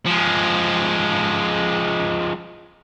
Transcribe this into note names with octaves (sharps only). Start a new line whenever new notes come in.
F3 G#3